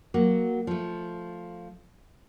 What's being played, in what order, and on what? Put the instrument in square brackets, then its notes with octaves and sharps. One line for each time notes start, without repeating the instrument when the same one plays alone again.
[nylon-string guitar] F#3 A#3 F#4
F3 A3